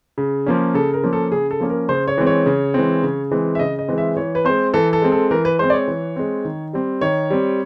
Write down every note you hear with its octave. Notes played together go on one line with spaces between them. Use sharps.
C#3
F3 A#3 C#4
C#3 A4
A#4
F3 A#3 C#4
A4
C#3 G#4
A4
F3 A#3 C#4
A#4
C#3 C5
C#5
E3 G#3 C4
C#5
C#3
E3 G#3 C4
C#3
E3 G#3 C4
E5
C#3 D#5
D#5
E3 G#3 C4
E5
E3 C#5
B4
G#3 C4 C5
E3 A4
A4
G#3 C4
A4
E3 A#4
B4
G#3 C4 C5
D5
C#5
E3
G#3 C4
D#3
G3 C4
D#3 C#5
G3 C4